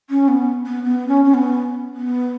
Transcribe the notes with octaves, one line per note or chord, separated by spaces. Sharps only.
C#4
B3
B3
B3
C#4
C#4
B3
B3